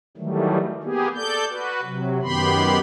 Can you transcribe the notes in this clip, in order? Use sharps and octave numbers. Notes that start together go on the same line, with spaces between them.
D#3 E3 F#3 G3 A3
A#3 B3 G4 G#4
A4 D5 G6
F#4 B4
C3 F#3
F#2 D#3 B3 G4 B5 C6